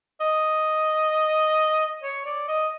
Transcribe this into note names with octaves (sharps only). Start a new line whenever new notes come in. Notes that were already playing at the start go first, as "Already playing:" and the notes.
D#5
C#5
D5
D#5